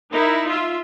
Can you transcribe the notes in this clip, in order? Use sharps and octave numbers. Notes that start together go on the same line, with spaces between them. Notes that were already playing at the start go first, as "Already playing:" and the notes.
D#4 E4 A#4
F4 E5